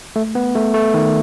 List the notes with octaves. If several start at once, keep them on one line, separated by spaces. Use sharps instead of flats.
A3
B3
A3
A3
D#3